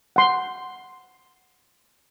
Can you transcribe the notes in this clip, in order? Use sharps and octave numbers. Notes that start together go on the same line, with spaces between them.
F#5 C6